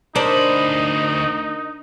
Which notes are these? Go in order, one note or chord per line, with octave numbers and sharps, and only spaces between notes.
D2 D4 D#4 A#4 C5 B5